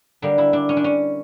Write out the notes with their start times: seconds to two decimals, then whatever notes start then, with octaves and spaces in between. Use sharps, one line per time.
0.22 D3 G3 A#3 D4
0.38 E4
0.53 D4
0.69 C#4
0.77 D4
0.84 C#4